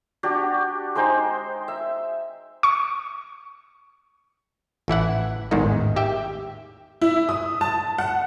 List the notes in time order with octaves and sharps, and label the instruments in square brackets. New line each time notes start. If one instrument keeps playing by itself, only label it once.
[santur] D4 F#4 G4
G#3 D#4 C5 G5
E5
[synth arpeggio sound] C#6
[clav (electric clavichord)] A1 E3 E4 F#5
A1 E2 G#2 D#3 G#3
G4 E5 G5
[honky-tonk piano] E4
D#6
A5
F#5